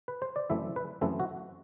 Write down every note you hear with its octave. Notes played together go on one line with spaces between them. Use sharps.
B4
C5
D5
F#2 E3 A3 C4 E4 E5
B4
F#2 E3 A3 C4 E4 A4
F#4